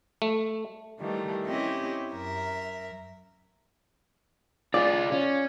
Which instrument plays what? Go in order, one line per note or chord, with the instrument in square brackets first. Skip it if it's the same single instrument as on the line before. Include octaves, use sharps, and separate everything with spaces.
[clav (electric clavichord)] A3
[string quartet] D#3 E3 G3 A3 A#3
C4 C#4 E4 G4 D#5 E5
F#2 A#4 E5
[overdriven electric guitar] F4 G#4 [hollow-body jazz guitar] D5
[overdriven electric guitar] C#4